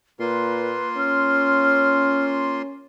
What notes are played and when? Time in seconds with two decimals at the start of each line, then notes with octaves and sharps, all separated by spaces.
0.20 A#2 A#3 F4 B4 C6
0.97 C#4 F6